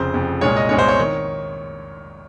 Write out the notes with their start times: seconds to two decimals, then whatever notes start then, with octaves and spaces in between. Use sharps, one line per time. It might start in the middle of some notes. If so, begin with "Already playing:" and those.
Already playing: F1 F2 C#3 C5
0.14 F1 F2 C#3
0.41 C2 A#2 G#3 C#5
0.56 D#5
0.69 C2 A#2 G#3 C#5
0.78 C5
0.88 C#5
0.99 D#3